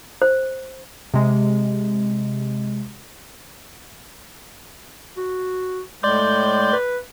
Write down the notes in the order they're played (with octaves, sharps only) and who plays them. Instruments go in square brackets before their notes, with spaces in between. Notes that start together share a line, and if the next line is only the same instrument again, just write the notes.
[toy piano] C5
[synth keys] C3 G#3
[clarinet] F#4
[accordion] A2 G6 [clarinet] G#3 [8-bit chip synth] D5 C6 D6
[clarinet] B4